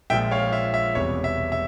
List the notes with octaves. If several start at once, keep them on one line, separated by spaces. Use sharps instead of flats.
A#1 A#2 F3 G#3 E5 G5
C#5 F5
E5
E5
E1 E2 C3 G3 C#5
E5
E5